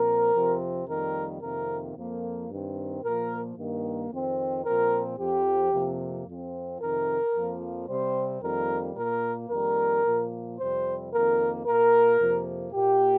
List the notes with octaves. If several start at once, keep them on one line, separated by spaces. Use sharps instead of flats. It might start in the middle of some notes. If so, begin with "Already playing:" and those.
Already playing: A#2 F3 C4 A#4
F2 C3 F3 C4
F2 D#3 G3 A#3 A#4
F2 C3 D#3 A#3 A#4
F2 F3 A#3
G2 D#3 C4
A#2 F3 A#3 A#4
G2 D#3 A#3
F2 D#3 C4
A#2 F3 C4 A#4
F2 F3 C4 G4
F2 C3 F3 A#3
F2 F3 C4
F2 C3 D#3 A#4
F2 F3 A#3
C3 G3 C4 C5
F2 D#3 G3 A#3 A#4
A#2 A#3 A#4
F2 D#3 G3 A#3 A#4
A#2 F3 A#3
F2 C3 G3 C4 C5
F2 D#3 A#3 A#4
A#2 A#3 A#4
F2 C3 F3 A#3
A#2 A#3 G4